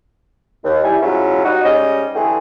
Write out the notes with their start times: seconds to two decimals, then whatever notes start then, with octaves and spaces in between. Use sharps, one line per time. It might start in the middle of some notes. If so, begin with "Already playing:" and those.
0.64 D#2
0.84 G3 E4 G#5
1.01 G#2 C#3 F#3 C#4 E4 F4
1.44 G3 D#4 F#4
1.64 G#2 G3 C#4 D#5
2.15 D3 E3 A3 B3 G4 G#4